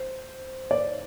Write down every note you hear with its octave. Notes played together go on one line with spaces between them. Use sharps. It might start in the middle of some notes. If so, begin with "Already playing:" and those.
Already playing: C5
D5